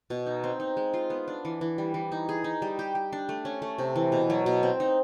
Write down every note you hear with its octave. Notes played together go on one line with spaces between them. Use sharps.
B2
D#4
C4
D#4
G#3
F4
B3
D4
E3
E3
G3
E3
D#4
G#4
D#4
G3
G4
G4
D4
A3
C#4
A3
C3
E3
B2
F#3
B2
C4
D#4